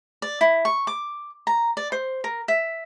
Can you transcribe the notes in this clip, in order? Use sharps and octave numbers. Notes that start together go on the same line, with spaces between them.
D5
E4
C#6
D6
A#5
D5
C5
A#4
E5